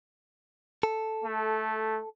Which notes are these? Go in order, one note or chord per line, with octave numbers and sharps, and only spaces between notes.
A4
A3